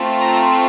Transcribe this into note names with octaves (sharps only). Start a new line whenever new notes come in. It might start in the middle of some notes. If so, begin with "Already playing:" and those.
Already playing: A3 C4 F4
A#5